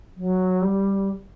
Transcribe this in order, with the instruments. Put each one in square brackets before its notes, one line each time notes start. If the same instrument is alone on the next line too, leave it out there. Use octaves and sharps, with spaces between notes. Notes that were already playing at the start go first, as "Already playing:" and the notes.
[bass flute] F#3
G3